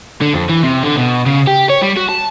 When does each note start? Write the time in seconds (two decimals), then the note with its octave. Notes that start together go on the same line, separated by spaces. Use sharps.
0.21 D3
0.34 F2
0.50 E3
0.64 C3
0.84 D3
0.97 B2
1.26 C#3
1.47 G4
1.69 C#5
1.82 G3
1.97 F#4
2.08 A5